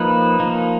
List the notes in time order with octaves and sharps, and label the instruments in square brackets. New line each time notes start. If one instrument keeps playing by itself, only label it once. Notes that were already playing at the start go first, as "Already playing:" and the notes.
Already playing: [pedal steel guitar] F3 A#3 D#4 B4
F3 A#3 D#4